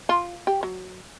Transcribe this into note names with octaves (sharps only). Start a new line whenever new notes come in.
F4
G4
F#3